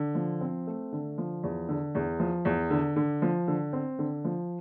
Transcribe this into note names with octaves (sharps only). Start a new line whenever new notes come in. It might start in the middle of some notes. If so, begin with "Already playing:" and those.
Already playing: D3
F3
C4
A3
D3
F3
E2
D3
E2
F3
E2
D3
D3
F3
D3
C4
D3
F3